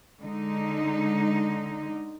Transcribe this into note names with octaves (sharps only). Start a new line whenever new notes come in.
D3 G#3 D#4